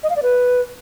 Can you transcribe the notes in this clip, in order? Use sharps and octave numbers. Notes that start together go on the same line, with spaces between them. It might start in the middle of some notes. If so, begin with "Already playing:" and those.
D#5
F5
D5
B4